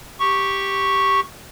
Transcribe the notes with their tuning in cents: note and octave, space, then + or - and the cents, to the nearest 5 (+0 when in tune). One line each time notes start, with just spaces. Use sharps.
G4 +0 C#6 +0